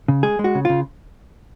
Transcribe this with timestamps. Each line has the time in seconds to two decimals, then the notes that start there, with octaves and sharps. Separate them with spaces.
0.08 C#3
0.23 G#3 G#4
0.39 G#3
0.44 F#4
0.55 C#3
0.65 C#3 F4